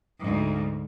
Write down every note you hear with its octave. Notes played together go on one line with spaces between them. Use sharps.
D2 G#2